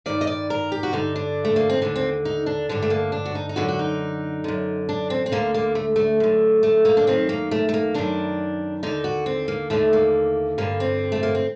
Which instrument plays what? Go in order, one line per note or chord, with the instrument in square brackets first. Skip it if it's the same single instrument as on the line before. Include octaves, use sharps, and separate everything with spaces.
[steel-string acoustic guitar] G2 D#3 D5
D#5
D5
A#4
G4
F#4
G2 D3 D#4
D4
A3
A#3
C4
D#2 D3 D4
C4
D#4
D4
G2 D3 D4
A3
A#3
D4
F#4
D#4
D#4
F#2 D3 F#4
F#4
D#4
F#2 D3
D4
C4
C4
D2 D3 A#3
A#3
A3
A3
F#2 D3
A3
A#3
D4
F#2 D#3 C4
A#3
A3
A3
A#3
F#2 D#3 D4
D#2 D3 D#4
F#4
C4
A#3
D#2 D3 A3
A#3
G2 D3 A#3
C4
A3
A#3
C4